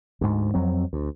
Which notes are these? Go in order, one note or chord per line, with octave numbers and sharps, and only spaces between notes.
D2 G#2
F2 F#3 C4
D2